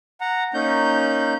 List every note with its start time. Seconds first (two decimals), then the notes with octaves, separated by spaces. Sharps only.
0.21 F#5 A#5
0.54 A#3 C#4 D#4 G6